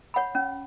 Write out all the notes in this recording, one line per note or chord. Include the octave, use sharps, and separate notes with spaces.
C#5 F#5 B5
C#4